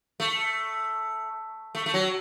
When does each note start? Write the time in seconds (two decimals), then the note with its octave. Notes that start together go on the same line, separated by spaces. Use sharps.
0.20 A3
1.75 A3
1.86 A3
1.94 F#3